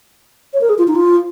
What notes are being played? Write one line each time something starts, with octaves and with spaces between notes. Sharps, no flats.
C#5
A#4
G#4
F4
D#4
F4